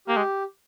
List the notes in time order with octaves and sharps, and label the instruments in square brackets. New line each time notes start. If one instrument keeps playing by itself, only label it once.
[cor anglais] A#3 [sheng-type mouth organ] G4
[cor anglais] G#3